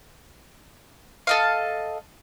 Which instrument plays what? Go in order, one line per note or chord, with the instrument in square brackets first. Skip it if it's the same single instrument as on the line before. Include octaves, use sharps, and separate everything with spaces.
[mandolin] A4 D#5 F5